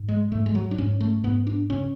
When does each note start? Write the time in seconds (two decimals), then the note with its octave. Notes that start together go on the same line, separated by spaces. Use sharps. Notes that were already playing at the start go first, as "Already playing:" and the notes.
Already playing: G#2
0.08 G#3
0.32 G#2 A3
0.46 G#3
0.55 F#3
0.71 D4
0.78 G#2 C#4
1.01 A3
1.24 G#2 B3
1.47 D4
1.70 C#3 C#4